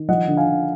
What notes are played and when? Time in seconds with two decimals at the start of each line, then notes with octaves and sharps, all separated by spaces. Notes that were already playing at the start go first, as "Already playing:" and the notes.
Already playing: D#3
0.09 F3 D#5 F#5
0.28 D3
0.37 F5 G#5
0.46 D3